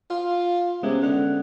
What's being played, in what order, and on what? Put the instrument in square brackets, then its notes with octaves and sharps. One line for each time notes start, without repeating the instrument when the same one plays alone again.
[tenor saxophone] F4 [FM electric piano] F5
[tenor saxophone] C3 [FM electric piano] G#3 B3 C#4
[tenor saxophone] D3